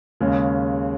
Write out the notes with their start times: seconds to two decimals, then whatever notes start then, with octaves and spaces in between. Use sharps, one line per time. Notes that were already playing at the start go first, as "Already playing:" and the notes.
0.20 D#2 C#3 G#3 C#4